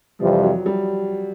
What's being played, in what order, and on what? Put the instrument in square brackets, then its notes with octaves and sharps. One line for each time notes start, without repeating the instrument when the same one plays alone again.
[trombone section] F2 C3 E3 G3 [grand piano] F3
[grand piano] F#3
G3